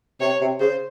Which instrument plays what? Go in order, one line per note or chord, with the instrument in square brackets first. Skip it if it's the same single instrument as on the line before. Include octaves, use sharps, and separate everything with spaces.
[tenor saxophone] C3 [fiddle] C#5
[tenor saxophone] C3
[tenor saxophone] C#3 [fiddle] C5